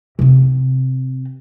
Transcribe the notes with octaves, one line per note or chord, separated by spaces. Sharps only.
C3 C4